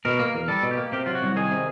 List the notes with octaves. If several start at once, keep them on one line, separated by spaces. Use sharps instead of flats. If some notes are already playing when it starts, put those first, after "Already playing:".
B2 A#4
A#3
A#4
E2
G3 A4
B2
G4
A#3
C3 G4
F#3 F4
F#4
C2
D#3 G#4
C3